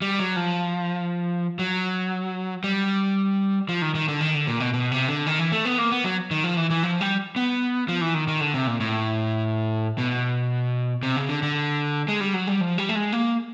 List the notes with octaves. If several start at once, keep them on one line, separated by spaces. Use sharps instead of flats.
G3
F#3
F3
F#3
G3
F3
D#3
D#3
D3
D#3
D3
A#2
B2
B2
C3
D3
D#3
E3
A3
B3
A#3
B3
F#3
D#3
F3
E3
E3
F3
G3
B3
F3
E3
D#3
D#3
D3
C3
A#2
A2
B2
C3
C#3
D3
D3
G#3
G3
F#3
G3
F3
G3
A3
G#3
A#3